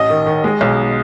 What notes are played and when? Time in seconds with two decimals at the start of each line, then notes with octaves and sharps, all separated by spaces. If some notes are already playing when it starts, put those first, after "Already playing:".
Already playing: A1 D#5
0.10 D#3
0.26 D#3
0.44 G#3
0.61 B1